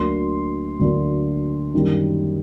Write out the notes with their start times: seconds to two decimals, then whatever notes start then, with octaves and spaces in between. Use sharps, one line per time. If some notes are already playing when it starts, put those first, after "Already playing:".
Already playing: D2 D3 F#3 A#3 C6
0.79 D2 D3 F#3 A#3
1.74 F#2 D#3 G3 A#3